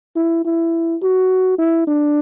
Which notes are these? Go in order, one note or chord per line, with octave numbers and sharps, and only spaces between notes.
E4
E4
F#4
E4
D4